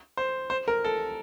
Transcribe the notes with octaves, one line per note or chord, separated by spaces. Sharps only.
C5
C5
A#4
A4